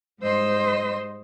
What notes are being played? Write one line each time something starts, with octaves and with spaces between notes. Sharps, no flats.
G#2 G3 C5 D#5 C6 E6